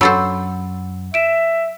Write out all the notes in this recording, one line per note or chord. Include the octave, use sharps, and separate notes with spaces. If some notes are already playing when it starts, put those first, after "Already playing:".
F#2 F#3 A4 C5 F#5 B5 E6
E5 D7 E7